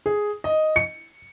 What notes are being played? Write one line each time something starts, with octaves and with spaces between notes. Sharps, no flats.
G#4
D#5
C#7